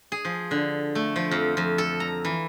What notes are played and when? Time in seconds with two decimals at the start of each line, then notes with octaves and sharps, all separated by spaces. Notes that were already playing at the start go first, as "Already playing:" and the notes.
0.12 G#4
0.25 F3
0.51 D3
0.95 A3
1.16 F3
1.31 F2
1.57 F2
1.78 A4
2.00 A#5
2.25 E3